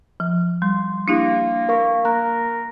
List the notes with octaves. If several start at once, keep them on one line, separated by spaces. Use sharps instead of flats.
F3
G3 C6
A#3 D4 E4 G4
A#4 F5 C#6
A#3 A#4 A#5 F#6